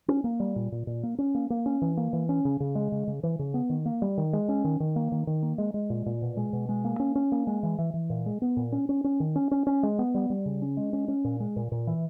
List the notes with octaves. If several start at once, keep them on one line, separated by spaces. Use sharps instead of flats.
C#4
A#3
G3
A#2
A#2
A#2
A#3
C#4
A#3
A#3
C#4
E3
A#3
E3
C#4
C#3
C#3
G#3
C#3
C#3
E3
C#3
B3
D#3
A#3
G3
D#3
G#3
C#4
D#3
D#3
A#3
D#3
D#3
A#3
G#3
G#3
A#2
A#2
B2
G#3
B2
G#3
A#3
C#4
C#4
A#3
G#3
E3
E3
E3
A#2
G#3
B3
A#2
C#4
C#4
C#4
D#3
C#4
C#4
C#4
G#3
B3
G3
G3
C#3
C#4
G#3
C#4
C#4
A#2
G#3
A#2
A#2
E3